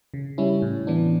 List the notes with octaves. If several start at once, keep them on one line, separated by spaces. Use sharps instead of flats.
C#3
G3 C#4 E4
A2
E3 B3 D4